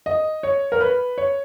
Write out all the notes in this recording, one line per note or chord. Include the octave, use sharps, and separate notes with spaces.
D#5
C#5
A#4
B4
C#5